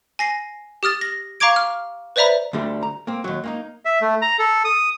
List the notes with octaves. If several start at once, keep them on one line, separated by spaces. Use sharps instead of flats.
G#5 A#6 C7
G4 D#6 F6 A6
A#6
F5 A#5 C#6 D6 G#6 D7
F6
B4 C5 D5 E5 A#5 B5
D2 D3 G3 A3 C4
A#5
A#3 C4
D#2 F#3
A#3 C4 D#4
E5
A3
A#5
A4
D#6